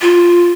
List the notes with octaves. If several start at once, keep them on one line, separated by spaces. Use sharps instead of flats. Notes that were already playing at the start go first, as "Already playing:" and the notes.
F4